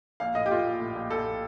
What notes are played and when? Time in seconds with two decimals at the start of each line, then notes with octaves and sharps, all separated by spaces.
0.20 A#1 F5
0.35 A2 D#5
0.46 G4
0.50 A3 F4
0.66 A#1
0.80 A2
0.95 A#1
1.11 A#1 A4
1.26 A2